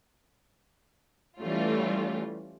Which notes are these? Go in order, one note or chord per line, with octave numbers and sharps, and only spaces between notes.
E3 G3 A3 C#4 F4